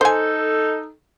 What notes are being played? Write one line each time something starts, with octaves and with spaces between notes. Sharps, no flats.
D#4 A4 C5 G#5